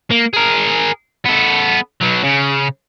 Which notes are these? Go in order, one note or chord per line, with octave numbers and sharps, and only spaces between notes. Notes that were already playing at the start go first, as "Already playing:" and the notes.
A#3
G#4 A#4
B3 A4
B2 F#3
C#3